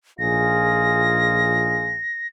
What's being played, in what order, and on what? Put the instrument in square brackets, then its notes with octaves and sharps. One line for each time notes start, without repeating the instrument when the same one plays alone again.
[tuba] A#1 [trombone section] D#4 F4 G#4 [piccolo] A#6